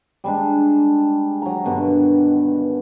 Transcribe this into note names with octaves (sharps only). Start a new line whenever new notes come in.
G3 G#3 D4
F#3 A#5
G2 B2 D3 D#3